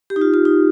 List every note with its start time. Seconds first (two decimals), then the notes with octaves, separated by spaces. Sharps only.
0.10 G4
0.16 D#4
0.21 F4
0.34 F4
0.45 D#4